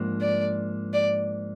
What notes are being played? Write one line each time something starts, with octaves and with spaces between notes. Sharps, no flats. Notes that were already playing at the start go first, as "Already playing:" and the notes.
Already playing: G#2 F3 A#3 D4
D5
D5